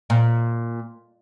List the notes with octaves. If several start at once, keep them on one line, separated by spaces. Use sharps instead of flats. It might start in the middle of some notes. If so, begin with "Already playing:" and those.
A#2